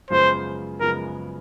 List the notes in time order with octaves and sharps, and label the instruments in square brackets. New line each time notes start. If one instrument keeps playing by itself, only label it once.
[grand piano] F#2 C#3 F3 G#3 B3 [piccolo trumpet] C5
[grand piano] F#2 C#3 F3 G#3 B3 [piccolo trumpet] A#4